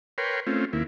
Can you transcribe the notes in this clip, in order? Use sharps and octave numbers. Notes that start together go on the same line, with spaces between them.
A#4 B4 C#5 G5 C6
A3 C4 C#4 F4
D#2 A#3 E4